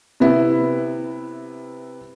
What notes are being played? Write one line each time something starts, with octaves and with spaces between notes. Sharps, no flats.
C3 B3 E4